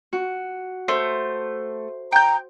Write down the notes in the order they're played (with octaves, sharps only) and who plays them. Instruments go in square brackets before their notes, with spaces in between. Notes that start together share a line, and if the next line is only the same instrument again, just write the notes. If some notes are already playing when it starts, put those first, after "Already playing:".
[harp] F#4
[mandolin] A3 [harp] C5
[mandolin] G5 G6 [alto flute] A#5